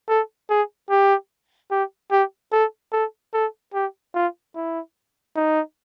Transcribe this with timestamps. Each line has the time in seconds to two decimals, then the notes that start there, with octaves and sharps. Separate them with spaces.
0.09 A4
0.50 G#4
0.90 G4
1.71 G4
2.11 G4
2.52 A4
2.93 A4
3.34 A4
3.74 G4
4.15 F4
4.55 E4
5.36 D#4